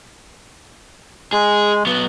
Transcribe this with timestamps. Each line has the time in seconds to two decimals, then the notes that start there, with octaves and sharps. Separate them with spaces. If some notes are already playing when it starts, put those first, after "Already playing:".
1.33 G#3 G#4
1.87 F#3 B3